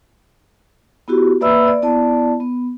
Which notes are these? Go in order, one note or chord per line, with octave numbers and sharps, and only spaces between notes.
B3 E4 F#4 G4
A#3 B4 D5 E5 B5 E6
D5
B3 E4 D5 A5
B3